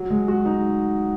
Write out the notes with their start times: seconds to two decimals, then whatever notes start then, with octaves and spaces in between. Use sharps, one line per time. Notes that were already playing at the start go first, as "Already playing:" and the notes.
Already playing: F#3
0.10 G#3
0.28 F#4
0.46 D#4